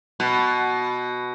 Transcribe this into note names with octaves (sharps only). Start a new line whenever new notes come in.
B2